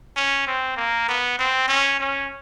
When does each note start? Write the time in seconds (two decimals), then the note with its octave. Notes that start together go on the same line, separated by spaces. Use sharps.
0.16 C#4
0.47 C4
0.77 A#3
1.09 B3
1.39 C4
1.68 C#4
2.00 C#4